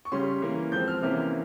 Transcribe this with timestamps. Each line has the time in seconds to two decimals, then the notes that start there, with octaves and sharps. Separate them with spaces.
0.05 C#6
0.12 C#3 G3 C#4 C6
0.42 E3 A#3 C#4
0.72 F3 G#3 C4 G6
0.88 F6
1.02 C3 E3 A#3 C#4